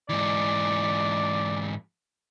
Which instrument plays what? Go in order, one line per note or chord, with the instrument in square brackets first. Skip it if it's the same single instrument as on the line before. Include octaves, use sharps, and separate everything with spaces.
[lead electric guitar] G#2 E3 [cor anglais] D5